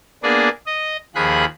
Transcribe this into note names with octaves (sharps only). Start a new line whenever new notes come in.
A#3 B3 D4 G#4 D5
D#5
D#2 F3 G#4 B5 F#6